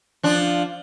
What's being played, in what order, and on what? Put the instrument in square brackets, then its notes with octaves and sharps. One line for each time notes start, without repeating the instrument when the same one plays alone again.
[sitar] F3 D4